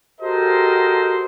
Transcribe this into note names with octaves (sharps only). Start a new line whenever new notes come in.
F#4 G4 A4 A#4 C5 D#5